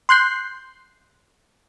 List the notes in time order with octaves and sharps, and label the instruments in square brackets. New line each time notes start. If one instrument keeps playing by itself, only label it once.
[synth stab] C6 F#6 G6 C7